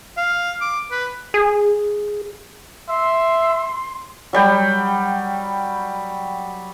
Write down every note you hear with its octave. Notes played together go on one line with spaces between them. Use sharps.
F5
D6
B4
G#4
E5 C6
F#3 G3 G5 B5